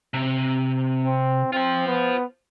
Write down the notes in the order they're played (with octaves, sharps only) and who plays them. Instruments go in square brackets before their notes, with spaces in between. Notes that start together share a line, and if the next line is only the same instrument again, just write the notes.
[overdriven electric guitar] C3
[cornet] C4
[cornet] C4 [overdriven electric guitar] F4 C5
[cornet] B3